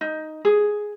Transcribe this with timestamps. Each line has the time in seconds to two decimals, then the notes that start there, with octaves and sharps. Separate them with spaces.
0.01 D#4
0.45 G#4